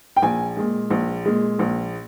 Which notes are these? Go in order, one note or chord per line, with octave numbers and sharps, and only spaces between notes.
G5
A#1 G#5
A#2 G#3
A#1
A#2 G#3
A#1